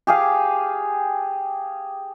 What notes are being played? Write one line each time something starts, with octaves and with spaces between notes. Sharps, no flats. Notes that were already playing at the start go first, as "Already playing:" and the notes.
G4 G#4 F5